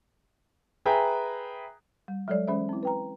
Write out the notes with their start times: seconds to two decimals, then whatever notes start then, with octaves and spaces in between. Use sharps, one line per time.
0.85 G#4 B4 E5 G5 G#5 A#5
2.08 G3
2.28 F#3 G#3 A4 C#5 D5
2.48 E3 G#3 C#4 G#4 C5 E5
2.69 C4 E4
2.83 B4 G5 A#5